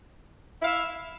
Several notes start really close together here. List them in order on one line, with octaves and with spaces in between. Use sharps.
E4 F5 E5